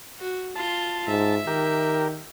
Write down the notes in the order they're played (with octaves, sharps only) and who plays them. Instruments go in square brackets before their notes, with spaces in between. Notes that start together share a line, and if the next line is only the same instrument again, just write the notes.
[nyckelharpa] F#4
[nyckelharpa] F4 C6 [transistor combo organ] A5
[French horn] G#2 [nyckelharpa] E5
[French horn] D#3 [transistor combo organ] G4 A#4